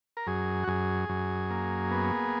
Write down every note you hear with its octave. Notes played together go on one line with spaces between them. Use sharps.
A#4
F#2 G#4
F#4
F#2 G#4
F#2
A#3
B3